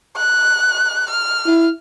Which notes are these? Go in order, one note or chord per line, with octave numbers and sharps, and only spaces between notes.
F#6
F6
E4